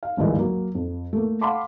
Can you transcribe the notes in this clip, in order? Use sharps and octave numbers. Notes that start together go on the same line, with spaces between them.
F5
G#1 D2 G2 D#3 E3 G#3
F#3 A#3
F2
A3 A#3
F5 F#5 A5 B5 C6 D6